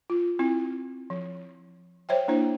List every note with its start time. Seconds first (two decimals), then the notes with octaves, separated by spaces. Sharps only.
0.10 F4
0.39 C4 E4
1.10 F3
2.09 C5 C#5 E5 G5
2.28 A#3 D4 E4 C5